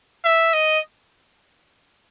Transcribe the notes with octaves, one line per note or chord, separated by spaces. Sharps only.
E5
D#5